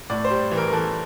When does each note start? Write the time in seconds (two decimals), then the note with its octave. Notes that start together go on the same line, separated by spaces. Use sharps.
0.10 A2 D5
0.25 C5
0.30 G3
0.51 E3
0.57 A#4
0.68 A#4
0.72 E3 A4